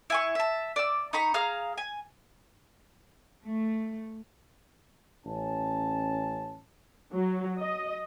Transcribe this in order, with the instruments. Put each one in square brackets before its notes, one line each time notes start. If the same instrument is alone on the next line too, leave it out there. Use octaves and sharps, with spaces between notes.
[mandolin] E4 G#5 C#6
E5 A5
D5 E6
D#4 A#5 B5 C#6
G#4 F5 A#5 F6
G#5
[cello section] A3
[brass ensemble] A1 C#4 A5
[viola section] F#3
D#5